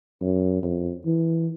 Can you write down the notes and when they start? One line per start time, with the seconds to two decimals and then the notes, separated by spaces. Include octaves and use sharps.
0.22 F#2
0.63 F2
1.05 E3